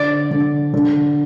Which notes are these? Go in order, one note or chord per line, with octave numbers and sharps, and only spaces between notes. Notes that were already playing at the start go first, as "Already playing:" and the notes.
Already playing: D3 C5 D5
D3
D3